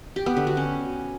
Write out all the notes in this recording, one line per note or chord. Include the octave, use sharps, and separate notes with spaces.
G4
B3
D3
F#4
C#4